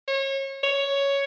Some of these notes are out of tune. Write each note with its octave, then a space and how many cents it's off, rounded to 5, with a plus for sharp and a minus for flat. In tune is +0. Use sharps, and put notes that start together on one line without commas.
C#5 -30
C#5 +5